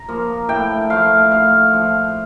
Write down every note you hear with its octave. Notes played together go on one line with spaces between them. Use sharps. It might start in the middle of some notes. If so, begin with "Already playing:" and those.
Already playing: A#5
F3 A#3
A2 G5
F3 A3 F5
A2 F5
F3